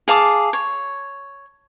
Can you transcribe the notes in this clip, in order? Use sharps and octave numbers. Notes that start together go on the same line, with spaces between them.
G#4 F5 A5 D6
C#5